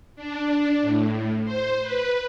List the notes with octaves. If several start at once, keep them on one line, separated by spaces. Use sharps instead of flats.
D4
A2
C5
B4